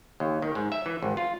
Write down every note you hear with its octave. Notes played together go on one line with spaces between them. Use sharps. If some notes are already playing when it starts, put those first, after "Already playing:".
D#2
D#3
G#2
E5
E3
G#1
F4